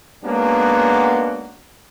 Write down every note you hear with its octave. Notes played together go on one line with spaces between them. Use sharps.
G#3 A#3 B3 C#4 D4 F#4